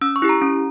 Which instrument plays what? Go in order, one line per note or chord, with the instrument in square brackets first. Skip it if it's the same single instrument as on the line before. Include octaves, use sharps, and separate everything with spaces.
[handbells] C#4 E6
C#6
E4 G4
A#5
C#4